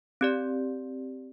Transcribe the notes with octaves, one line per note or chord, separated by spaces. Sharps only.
C4 G4 D5